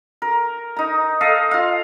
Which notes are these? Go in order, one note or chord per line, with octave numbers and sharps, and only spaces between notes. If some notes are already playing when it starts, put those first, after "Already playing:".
A#4
D#4 A#5
A4 D#5 F5
F4 F5